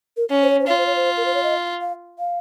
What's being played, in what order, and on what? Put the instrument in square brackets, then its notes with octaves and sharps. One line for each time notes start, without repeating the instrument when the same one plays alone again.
[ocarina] A#4
[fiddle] C#4
[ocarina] C5
C#5
C5
[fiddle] F4 [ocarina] C#5
[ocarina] C5
C#5
C5
A#4
C5
C#5
D#5
F5
F5